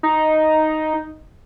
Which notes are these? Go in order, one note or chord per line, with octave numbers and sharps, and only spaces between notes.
D#4